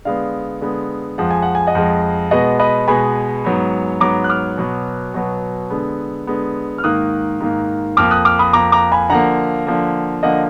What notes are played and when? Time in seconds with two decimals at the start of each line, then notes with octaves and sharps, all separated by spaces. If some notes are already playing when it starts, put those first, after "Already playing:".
0.05 D3 G#3 B3 D5 F5
0.61 D3 G#3 B3
1.18 F2 F3 G#3 F#5
1.31 G#5
1.42 F#5
1.55 G#5
1.67 D#5 F#5
1.75 F2 F3 G#3
2.31 B2 G#3 B3 D#5 F#5
2.59 B4 D#5
2.88 B2 G#3 B3 G#5 B5
3.45 G#2 F#3 B3
4.00 G#2 F#3 B3 A#5 D6
4.24 F#6
4.29 D6 F6
4.58 B2 F#3 B3
5.14 B2 F#3 B3
5.70 D3 G#3 B3
6.27 D3 G#3 B3
6.78 F6
6.84 G#2 D#3 A#3 D#6 F#6
7.40 G#2 D#3 A#3
7.97 F2 F3 A#3 D6 F6
8.11 D#6 F#6
8.25 D6 F6
8.39 B5 D#6
8.53 F2 F3 A#3 A#5 D6
8.72 A#5 D6
8.92 G#5 B5
9.10 D3 F3 A#3 F#5 A#5
9.67 D3 F3 A#3
10.23 D3 F3 A#3 D#5 F#5